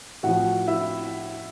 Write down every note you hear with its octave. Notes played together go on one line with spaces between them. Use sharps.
A2 F3 F#4 F#5
E4 E5